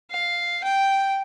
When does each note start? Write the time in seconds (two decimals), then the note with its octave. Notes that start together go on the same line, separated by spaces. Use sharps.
0.11 F5
0.64 G5